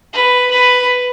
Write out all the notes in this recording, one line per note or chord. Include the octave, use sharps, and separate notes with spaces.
B4
B4